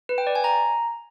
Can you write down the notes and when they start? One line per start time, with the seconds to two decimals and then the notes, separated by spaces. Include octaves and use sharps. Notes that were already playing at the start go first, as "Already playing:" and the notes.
0.09 B4
0.18 G5
0.27 D5
0.35 G#5
0.44 A#5